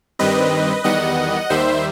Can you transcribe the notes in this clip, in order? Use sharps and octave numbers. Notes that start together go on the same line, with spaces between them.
G2 D#3 G3 C4 B4 D#5
E2 D#3 G3 B3 D#5 F#5
D#2 D#3 G3 C5 E5